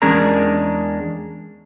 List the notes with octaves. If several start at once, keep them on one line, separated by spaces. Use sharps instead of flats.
E2 G#3 C#4 D4 A#4 A#5